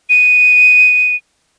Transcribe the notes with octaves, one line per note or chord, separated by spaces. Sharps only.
D#7